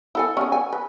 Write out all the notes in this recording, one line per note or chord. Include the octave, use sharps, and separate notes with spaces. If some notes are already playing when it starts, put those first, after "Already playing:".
E4 A4 G#5
C#4 G#4
G#5
B4